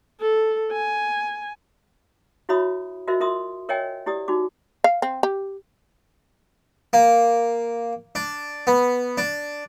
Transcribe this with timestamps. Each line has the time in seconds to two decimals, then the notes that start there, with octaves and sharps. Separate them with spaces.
0.20 A4
0.72 G#5
2.49 E4 F#4 C#5 E5 B5 D#6
3.07 F4 F#4 A#4 C5 D#5 E5
3.20 F4 A#4 E5 C6 D#6
3.69 A#4 C#5 D#5 E5 G5 G#5
4.06 E4 G4 D5 D#6
4.28 D#4 F#4 D6
4.84 F5
5.02 C4
5.23 G4
6.93 A#3
8.15 D4
8.67 B3
9.18 D4